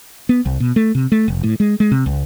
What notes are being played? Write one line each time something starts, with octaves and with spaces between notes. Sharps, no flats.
B3
C2
B2
A3
C3
A3
F1
A2
G#3
G#3
C3
C#2